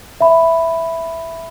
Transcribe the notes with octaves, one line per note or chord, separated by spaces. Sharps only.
E5 B5